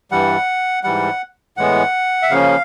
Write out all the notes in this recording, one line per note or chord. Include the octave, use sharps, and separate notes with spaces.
G2 E3 G3 F#5
G#2 E3 G3 F#5
A2 E3 G#3 B3 F#5
E5
C#3 F3 A#3 C#4 F5